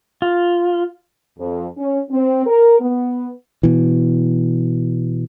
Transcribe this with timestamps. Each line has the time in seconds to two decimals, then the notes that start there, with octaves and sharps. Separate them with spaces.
0.22 F4
1.38 F2
1.77 C#4
2.10 C4
2.46 A#4
2.80 B3
3.63 B2 E3